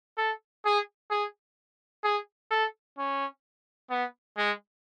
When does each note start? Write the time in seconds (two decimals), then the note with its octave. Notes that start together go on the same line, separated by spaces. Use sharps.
0.17 A4
0.65 G#4
1.11 G#4
2.04 G#4
2.51 A4
2.98 C#4
3.90 B3
4.37 G#3